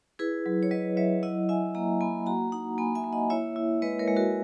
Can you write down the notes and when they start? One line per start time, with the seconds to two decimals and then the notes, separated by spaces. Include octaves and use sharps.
0.19 E4 G#4 B4
0.46 F#3
0.63 C#5
0.71 F#3 B4 D#5
0.97 F#3 C#5 E5
1.23 E4 D#5 F#5
1.49 E4 E5 G#5
1.75 A#3 F#5 A#5
2.01 A#3 G#5 B5
2.26 F#4 F#5 A#5
2.52 D#4 F#5 A#5
2.78 A#3 G#5 B5
2.95 E5 G#5
3.04 A#3
3.13 D#5 F#5
3.30 E4 C#5 E5
3.56 E4
3.82 G#3 B4 D#5
3.99 A#4 C#5
4.08 G#3
4.17 F#4 A#4